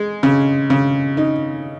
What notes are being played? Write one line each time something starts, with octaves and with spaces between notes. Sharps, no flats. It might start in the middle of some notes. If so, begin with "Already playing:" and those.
Already playing: G#3
C#3
C#3
D#4